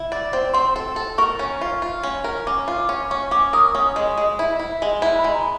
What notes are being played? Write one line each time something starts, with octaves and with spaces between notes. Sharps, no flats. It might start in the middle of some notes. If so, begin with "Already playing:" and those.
Already playing: E4
D5
C4
C4 C6
A4
A4
A#4 C#6
C#4
F4
F4
C#4
A#4
C#4 D6
F4
D6
C#4
C#4 C#6
C#4 D6
A#4 D#6
C#4 D#6
G#3
G#3
E4
E4
G#3
E4
B5
G#3
A#5